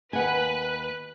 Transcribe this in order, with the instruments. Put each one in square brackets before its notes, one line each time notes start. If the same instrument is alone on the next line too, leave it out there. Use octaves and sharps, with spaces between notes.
[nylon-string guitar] D#2 F#5 G#5 [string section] B4 F#6